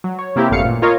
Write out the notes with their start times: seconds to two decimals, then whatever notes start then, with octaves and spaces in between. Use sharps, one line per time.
0.04 F#3
0.19 C#5
0.36 C3 A#3 C4 E4 G4
0.50 G#1 F#2 A3 B3 F5 C#7
0.65 A#2
0.82 F4 A#4 C#5 D#5 F5